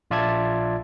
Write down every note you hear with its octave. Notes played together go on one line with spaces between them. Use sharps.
A#1 F4 D5 E5 A5 G#6